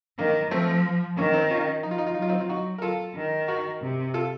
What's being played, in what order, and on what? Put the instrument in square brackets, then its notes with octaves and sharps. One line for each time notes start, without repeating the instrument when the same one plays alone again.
[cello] D#3 [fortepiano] A#3
[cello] F3 [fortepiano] A3 C4
[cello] D#3 [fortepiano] A#3 C#4
[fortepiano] C4 D#4
C#4 F4
[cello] F3 [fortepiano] D#4
[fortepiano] F4
D#4
F4
[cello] F#3 [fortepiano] D#4
[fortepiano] F4
C4 D#4
F4
[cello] F#3 [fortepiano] D#4 F#4
[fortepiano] A#4
F4 A4
[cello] D#3
[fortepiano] F#4 A#4
[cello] C3
[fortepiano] F4 A4